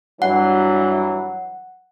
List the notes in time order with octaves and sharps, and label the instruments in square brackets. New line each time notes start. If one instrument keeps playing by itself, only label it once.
[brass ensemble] G2 E3 F#3 [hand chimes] F#5